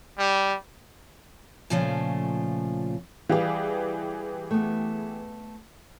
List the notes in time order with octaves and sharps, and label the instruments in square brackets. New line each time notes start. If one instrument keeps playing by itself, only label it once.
[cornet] G3
[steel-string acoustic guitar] A#2 C#3 F3 A3 C#4 C5
[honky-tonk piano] E3 G4 G#4 [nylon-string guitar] G3 F5
[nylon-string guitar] A3 B3